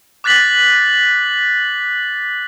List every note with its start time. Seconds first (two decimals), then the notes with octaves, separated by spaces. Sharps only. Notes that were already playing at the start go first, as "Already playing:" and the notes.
0.24 D6 F#6 A6 B6 F#7